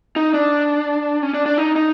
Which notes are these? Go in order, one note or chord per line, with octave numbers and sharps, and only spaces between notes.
D#4
D4
C#4
D4
D4
D#4
D#4